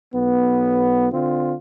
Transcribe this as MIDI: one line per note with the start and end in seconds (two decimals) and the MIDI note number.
0.14 1.07 35
0.14 1.07 59
1.12 1.56 50
1.12 1.56 60
1.12 1.56 65